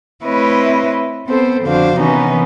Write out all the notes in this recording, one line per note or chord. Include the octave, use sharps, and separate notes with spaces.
A3 C4 E4 B4 C#5 D#5
B3 C4 A4 C5
F2 D3 D4 F#4 C5 F5
C3 D#3 E3 B3 C#4 D#4